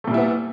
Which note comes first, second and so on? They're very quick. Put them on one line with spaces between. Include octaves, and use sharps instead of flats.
A3 A#2 G3 E4 B3